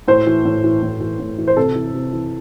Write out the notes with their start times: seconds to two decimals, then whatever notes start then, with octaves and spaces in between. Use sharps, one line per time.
0.08 A2 C5
0.27 E3
0.45 A2
0.64 E3
0.82 A2
1.00 E3
1.20 A2
1.38 E3
1.47 C5
1.57 C3 A4
1.75 E3
1.94 C3
2.13 E3